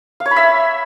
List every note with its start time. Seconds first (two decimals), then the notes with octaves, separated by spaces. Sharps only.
0.20 F5
0.26 C#5
0.31 B5
0.36 E5